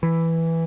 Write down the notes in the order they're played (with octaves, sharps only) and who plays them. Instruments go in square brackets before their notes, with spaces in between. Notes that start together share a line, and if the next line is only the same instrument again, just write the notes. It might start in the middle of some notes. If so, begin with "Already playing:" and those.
[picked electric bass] E3